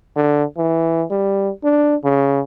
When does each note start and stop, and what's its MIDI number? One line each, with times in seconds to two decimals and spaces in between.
0.16 0.44 50
0.58 1.04 52
1.11 1.51 55
1.64 1.96 62
2.04 2.41 49